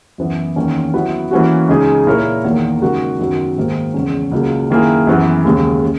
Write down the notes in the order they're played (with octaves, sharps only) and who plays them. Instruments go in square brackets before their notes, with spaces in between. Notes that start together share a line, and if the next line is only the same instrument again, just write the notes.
[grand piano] F#2 E3 B3 E4
E2 D#3 A#3 C#4
F#3 B3 E4 B4
E3 A#3 C#4 F#4
C#2 C#3 G#3 D#4 G#4
A#2 A#3 E4 A#4 C#5
E2 D#3 A#3
C#3 G#3 D#4 F#4 A#4
F#2 D#3 F#3 B3 F#4
G#2 D#3 A#3
E2 C#3 G#3 C#4
C#2 C#3 F#3 A#3
F#2 D#3 A#3 E4 G#4
F#2 E3 B3
D#2 C#3 G#3
C#3